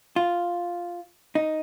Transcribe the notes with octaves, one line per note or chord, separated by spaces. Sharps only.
F4
D#4